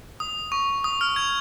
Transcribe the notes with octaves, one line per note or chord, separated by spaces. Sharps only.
D#6
C#6
D#6
F6
G#6